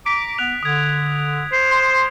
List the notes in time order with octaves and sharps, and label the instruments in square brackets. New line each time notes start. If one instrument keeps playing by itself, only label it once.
[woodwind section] A#5 D6 [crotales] B6 D7
[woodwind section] B3 [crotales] F#6 D7 F7
[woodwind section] D3 [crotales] D#6 G#6
[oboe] C5
[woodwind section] C6